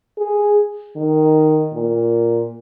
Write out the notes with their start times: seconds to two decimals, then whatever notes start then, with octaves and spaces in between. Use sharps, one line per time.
0.18 G#4
0.96 D#3
1.73 A#2